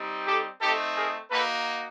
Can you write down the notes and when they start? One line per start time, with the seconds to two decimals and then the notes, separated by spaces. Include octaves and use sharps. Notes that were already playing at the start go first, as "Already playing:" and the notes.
Already playing: G3 C4 D#4
0.27 G4 A4
0.61 A3 C4 D#4 G4 A4
0.96 G#4 A#4
1.30 A#3 D#4 F#4 A4 B4